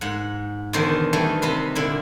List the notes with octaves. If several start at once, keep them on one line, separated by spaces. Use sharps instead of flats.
G#2 F#5
E2 B2 D3 D#3 C5
D#3 E3 G3 A3
C3 D#4 B4 C6
A#2 D3 E4